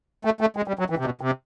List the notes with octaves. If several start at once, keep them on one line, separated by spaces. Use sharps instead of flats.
A3
A3
G#3
G3
F#3
E3
C3
B2
C3